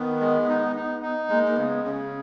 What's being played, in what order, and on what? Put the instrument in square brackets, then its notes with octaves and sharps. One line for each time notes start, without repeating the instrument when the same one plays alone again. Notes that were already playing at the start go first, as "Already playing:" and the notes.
Already playing: [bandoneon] D#3 [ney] B3
[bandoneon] G#3
D#4
D#4
D#4
[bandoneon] G#3 [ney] A#3
[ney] A#3
[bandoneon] C#3 [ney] B3
[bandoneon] C#3 [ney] C#4